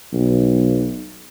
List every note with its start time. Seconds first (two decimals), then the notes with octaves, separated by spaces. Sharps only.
0.13 B1